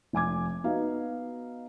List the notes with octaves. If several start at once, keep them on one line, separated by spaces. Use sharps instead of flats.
F1 G#5 D6 G#6
B3 D#4 F#4 F5